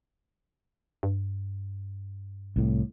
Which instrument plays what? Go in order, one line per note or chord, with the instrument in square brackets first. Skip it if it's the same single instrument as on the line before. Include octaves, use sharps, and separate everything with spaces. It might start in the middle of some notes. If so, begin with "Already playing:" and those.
[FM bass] G2
[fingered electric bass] C2 A2